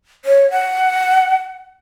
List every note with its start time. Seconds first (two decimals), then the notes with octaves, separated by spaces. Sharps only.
0.25 C#5
0.51 F#5